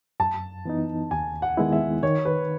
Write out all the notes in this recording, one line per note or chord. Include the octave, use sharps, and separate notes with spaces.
F#2 A5
E3 B3 D#4
D#2 G#5
F#5
D#3 G#3 B3 E4
E5
D#3 C#5
B4